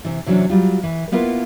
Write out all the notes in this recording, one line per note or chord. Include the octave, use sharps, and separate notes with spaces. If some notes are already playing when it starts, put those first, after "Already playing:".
C3 E3
C3 E3 F#3 C#4 D4
F#3 G3 F4
E3
A#3 B3 E4 F4 A#4 B4